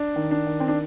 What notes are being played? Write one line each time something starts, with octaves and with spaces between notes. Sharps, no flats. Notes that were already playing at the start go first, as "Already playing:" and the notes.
Already playing: D4
D#3
D4
D#3
C4
D4